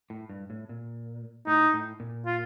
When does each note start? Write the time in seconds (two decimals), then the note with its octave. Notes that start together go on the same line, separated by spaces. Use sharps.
0.10 A2
0.29 G2
0.50 A2
0.69 A#2
1.47 A2 D#4
1.74 A2
2.00 A#2
2.25 F4